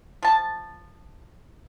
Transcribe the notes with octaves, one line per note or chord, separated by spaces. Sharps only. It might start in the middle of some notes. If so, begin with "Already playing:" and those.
F3 A5